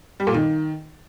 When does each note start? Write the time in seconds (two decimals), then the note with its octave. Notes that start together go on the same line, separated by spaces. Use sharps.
0.20 G3
0.27 A#2
0.34 D#3